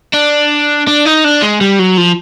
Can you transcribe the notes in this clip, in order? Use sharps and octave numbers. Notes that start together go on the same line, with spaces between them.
D4
D4
D#4
D4
G#3
G3
F#3
F3